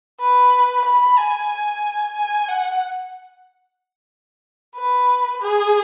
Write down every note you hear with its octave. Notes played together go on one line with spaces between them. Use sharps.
B4
B5
G#5
G#5
F#5
B4
G#4